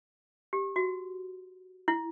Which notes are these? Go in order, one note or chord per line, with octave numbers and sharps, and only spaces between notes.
G4
F#4
E4